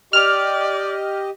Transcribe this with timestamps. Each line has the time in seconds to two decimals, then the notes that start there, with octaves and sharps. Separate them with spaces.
0.13 G4 D5 D#5 F6